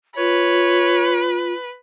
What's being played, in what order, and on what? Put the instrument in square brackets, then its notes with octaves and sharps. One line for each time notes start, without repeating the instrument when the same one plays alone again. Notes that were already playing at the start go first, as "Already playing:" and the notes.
[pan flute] F4 [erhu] B4 [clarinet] C#5